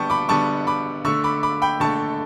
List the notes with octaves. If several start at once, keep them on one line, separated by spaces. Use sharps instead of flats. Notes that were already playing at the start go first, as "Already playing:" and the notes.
Already playing: D3 G3 B3 G5 A5 C#6
B5 D6
D3 G3 B3 A5 C#6
B5 D6
D3 A3 C#6 E6
B5 D6
B5 D6
G5 B5
D3 A3 A5 C#6